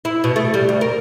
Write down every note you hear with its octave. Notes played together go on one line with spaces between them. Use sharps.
E4
B2
A3
G3
D2
A#4